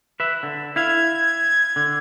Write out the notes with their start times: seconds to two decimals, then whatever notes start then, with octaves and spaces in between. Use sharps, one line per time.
0.20 B4 E5
0.43 D3
0.76 E4 F5 G#6
1.76 D3